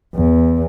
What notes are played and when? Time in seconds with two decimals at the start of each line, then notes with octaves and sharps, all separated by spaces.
0.15 E2